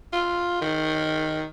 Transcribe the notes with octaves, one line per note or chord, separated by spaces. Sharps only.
F4
D#3